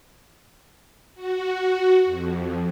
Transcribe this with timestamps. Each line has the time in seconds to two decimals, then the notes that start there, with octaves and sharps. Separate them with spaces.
1.15 F#4
2.05 F2